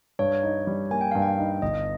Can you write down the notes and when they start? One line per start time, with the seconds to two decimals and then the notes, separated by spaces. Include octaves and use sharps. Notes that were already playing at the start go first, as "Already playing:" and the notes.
0.19 G2 C#5
0.43 D#4
0.67 G3
0.91 A#3 G#5
1.01 G5
1.12 G2 F5
1.22 G5
1.38 D#4
1.62 G1 D#5